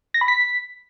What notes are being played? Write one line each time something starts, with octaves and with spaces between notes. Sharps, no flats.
A#6
B5
B6